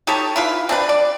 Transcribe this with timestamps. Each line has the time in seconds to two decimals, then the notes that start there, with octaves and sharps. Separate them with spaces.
0.07 D#4 G4 A4 C#5
0.36 E4 F4 B4
0.69 C4 D4 B4
0.89 D5